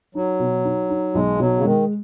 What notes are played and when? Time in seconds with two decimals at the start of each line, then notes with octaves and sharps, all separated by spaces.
0.15 F#3 D#4
0.39 B2
0.64 D#4
0.89 D#4
1.14 B1 G#3
1.39 B2 F#3
1.57 C#3
1.64 D#3 G#3